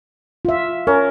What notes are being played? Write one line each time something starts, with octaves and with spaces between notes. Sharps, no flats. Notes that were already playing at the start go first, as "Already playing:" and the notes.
F4 E5
C#4 A#4